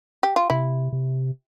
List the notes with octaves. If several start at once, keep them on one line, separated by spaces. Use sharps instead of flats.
G4
F4
C3 E4
C3